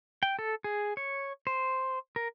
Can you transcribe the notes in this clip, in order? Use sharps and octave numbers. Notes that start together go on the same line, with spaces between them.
G5
A4
G#4
C#5
C5
A#4